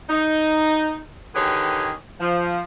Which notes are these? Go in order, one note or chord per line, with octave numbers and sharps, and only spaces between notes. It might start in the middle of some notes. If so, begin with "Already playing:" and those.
D#4
D3 D#3 G4 G#4 B4 C#5
F3